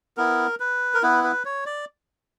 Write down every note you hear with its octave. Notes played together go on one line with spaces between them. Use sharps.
B3 E4 A#4
B4
A#4
B3 E4 B4
B4
C#5
D5